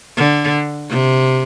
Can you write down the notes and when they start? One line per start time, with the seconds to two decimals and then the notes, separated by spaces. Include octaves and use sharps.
0.17 D3
0.89 C3